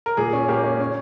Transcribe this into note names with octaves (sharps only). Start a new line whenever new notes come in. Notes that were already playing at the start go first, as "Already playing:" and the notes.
A#4
A#2 G#4
C#4
A#3 G4
C#4
C#4